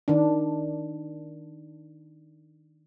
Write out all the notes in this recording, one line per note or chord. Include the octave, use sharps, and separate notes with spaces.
D#3 D4